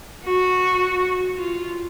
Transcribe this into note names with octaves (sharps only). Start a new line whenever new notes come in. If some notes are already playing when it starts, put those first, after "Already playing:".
F#4
F4